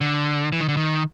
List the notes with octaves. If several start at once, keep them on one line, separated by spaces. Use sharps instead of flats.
D3
E3
D#3
D3
D#3